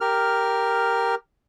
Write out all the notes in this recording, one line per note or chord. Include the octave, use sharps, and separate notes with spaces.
G4 A#4 F6